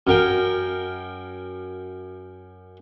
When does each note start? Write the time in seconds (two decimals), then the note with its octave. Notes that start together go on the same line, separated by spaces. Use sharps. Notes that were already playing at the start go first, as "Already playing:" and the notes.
0.07 F#2 A#4 G5